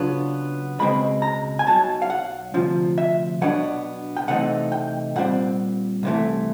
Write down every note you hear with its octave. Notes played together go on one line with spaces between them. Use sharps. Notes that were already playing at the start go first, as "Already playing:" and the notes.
Already playing: C#3 F#3 B3 D4 F4
C#2 B2 G#3 C4 B5
A#5
G#5
B1 B2 F#3 A5
F5
F#5
D2 C3 F3
E5
B2 F#3 B3 D4 F#5
G5
C3 E3 A3 C4 D#4 F#5
G5
A#2 G3 C4 F#5
C2 C3 E3 A3